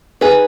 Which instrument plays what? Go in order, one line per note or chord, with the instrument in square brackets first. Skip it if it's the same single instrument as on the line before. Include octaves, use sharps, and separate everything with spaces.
[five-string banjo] D#4 G#4 B4